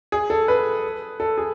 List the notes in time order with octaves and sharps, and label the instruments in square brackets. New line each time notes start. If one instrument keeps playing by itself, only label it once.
[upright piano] G#4
A4
B4
A4
G#4